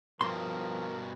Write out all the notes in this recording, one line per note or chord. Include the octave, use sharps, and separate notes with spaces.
G2 B2 F3 A#4 C6